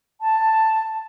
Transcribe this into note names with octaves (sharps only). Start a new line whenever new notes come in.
A5